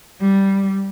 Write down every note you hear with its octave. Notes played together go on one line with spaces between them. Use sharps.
G3